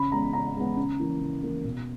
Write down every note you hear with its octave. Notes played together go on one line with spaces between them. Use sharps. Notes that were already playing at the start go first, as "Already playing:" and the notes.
Already playing: C#3 B5
G#3 B3 A#5
C#3 A#5
G#3 B3
C#3
E3 A#3
C#3
E3 A#3
B2